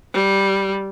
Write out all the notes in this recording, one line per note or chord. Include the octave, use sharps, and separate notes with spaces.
G3